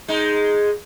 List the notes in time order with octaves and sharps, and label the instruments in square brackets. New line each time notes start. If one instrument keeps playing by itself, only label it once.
[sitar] G#3 D#4